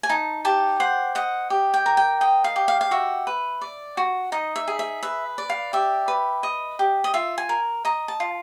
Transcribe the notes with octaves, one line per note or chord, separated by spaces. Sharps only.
G#5
D#4 A5
G4 A5
C5 F#5
D#5 F#5
G4
G5
A#4
G5
D#5 G5
F5
G4
F5
F5
F#4 E5
B4
D5
F#4
D#4 D#5
E5
G#4
E5
B4 E5
D5
F5
G4 E5
B4
D#5
G4
D#5
F4 E5
G#5
A#4
D#5 A#5
A5
F4